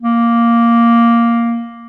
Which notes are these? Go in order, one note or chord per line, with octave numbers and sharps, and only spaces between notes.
A#3